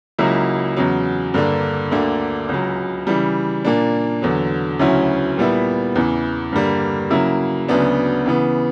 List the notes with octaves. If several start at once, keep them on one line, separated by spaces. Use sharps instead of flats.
C#2 C#3 F#3 A#3 E4
E2 C#3 F#3
G2 D3 A#3 D4
D2 D3 A#3 D4
C#2 C#3 F#3
C#3 E3 G3
A#2 A#3 D4
E2 D3 F#3
D2 C#3 F#3 C#4 E4
A#2 G3 B3 E4
E2 C#3 E3
G2 D3 G3 A#3
C#3 F#3 A#3 E4
D2 C#3 F#3 B3 D4
C#3 E3 B3